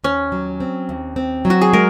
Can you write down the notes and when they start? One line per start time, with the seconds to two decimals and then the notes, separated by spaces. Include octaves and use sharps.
0.04 D#2 C#4
0.32 F#3
0.60 C4
0.89 D#2
1.16 C4
1.45 F#3
1.50 F#4
1.61 G#4
1.73 G#3 A#4